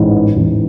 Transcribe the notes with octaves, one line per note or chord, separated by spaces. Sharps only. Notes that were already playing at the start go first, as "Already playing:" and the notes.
Already playing: A1 G#2 E3
A1 G#2 E3